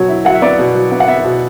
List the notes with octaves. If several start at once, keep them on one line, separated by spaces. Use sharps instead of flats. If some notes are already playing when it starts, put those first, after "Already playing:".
Already playing: B2 F#3 C#5
E4
F#3 F#5
E5
B3 D5
B2
F#3
B3
F#5
B3 E5
B2